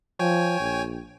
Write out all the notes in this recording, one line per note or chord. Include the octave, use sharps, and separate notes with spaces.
F3 C#5 G5 G#5
A#1